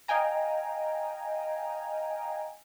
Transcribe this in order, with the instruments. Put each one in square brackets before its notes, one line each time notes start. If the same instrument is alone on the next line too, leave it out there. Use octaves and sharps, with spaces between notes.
[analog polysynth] D#5 F5 G5 G#5 A#5